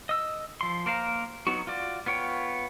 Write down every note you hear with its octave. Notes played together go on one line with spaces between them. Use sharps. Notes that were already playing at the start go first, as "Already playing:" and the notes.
D#5 E6
F3 C6
A#3 A#4 C5 F5 A#5
F#3 B3 D#4 F#4
F4 F#4 D5
B3 F4 C#5 G5